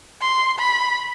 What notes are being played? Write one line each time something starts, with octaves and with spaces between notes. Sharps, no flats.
C6
B5